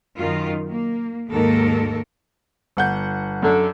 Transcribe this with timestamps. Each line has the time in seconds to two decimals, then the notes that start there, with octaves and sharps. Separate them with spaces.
0.16 F#2 D#3 F4
0.68 A#3
1.30 D#2 G#2 A#3 A4 A#4
2.77 G1 F#5 G6
3.43 F#2 D3